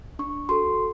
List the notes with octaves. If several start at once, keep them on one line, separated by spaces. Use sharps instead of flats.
D4 C#6
F#4 A4 C6